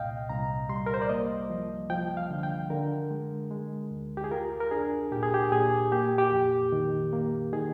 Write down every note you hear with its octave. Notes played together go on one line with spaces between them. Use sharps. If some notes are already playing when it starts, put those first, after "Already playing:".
Already playing: C2 A#2 D#5 F5 G5
C2 A#5
G3 C6
A#4
C5
D5
A#3 D#5
F3
F3 G5
F5
D3
G5
D3 A#4
G#3
G#3
D2
G4
G#4
F4 A#4
A#4
D4 G#4
A#2 G4
G#4
G4
A#2 G#4
A#3 G4
G4
F2
D#3
A#3
D#3 G#4